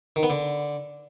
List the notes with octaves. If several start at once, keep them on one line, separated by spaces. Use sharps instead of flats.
D#3
B3
D3